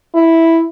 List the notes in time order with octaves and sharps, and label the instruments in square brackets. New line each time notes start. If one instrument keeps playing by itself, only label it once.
[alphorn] E4